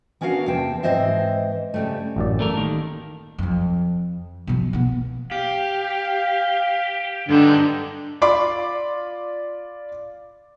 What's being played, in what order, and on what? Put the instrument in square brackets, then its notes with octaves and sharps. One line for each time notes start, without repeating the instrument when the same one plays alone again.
[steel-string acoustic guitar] B3 C#4 D4 F#4 A#4 F5
E2 C3 A#3 G5 A5
G#2 E3 C4 C5 D#5 E5
C#3 G3 A3
[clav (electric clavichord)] A1 F#2 D5
[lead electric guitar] A3 A#4 [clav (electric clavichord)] A4
[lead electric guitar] D#2 D#3
[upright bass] F2 F3
B2 F3
A#3 B3
[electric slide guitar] G4 [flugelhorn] F5
[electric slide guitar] G2 D#4 G5 [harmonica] D3
[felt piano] F4 D5 B5 C6 D6